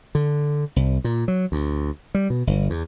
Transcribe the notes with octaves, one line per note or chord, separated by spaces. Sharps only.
D3
C2
A#2
F#3
D2
G3
B2
G1
E2